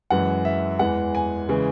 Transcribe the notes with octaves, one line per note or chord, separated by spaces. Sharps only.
F#2 E3 G#3 F#5
E5
E2 E3 G#3 F#5
G#5
C#3 E3 G#3